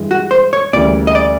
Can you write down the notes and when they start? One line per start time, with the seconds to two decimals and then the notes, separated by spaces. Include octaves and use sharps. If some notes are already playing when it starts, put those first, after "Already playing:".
Already playing: G2 E3 G#3
0.11 F#4
0.31 C5
0.53 C#5
0.73 D2 C#3 E3 G3 A#3 D5
1.07 D#5
1.15 D5